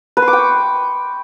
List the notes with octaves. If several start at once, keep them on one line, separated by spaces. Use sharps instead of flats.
B4
C6
D6
G5
C#6